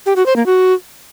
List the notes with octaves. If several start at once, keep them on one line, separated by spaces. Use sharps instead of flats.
G4
F#4
C5
A#3
F#4